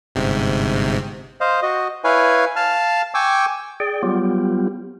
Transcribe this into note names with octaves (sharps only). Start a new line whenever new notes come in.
G1 G#2 C3
C5 D#5 F5
F#4 D#5
E4 B4 C#5 F5 G#5
F5 A5 F6
G5 G#5 C#6 D6 E6
G#4 D5 G5
F#3 G3 B3 F4 G4